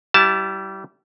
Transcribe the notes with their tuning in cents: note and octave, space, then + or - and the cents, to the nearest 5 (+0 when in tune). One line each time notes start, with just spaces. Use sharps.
G3 -25 E4 +5 A5 +0